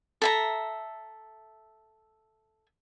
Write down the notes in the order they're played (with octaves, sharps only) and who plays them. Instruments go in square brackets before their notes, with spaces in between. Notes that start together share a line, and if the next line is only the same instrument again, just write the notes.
[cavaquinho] A4 E5 A#5